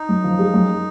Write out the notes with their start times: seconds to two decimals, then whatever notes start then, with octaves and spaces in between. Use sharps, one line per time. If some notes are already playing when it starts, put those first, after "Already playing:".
Already playing: D#4
0.09 F#2
0.24 F3
0.39 G#3
0.54 F#2